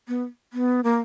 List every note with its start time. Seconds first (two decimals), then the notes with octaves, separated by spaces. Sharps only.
0.08 B3
0.53 B3
0.84 A#3